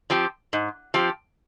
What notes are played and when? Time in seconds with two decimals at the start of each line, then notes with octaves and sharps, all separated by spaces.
0.10 F3 C4 G4
0.53 G#2
0.94 F3 C4 G4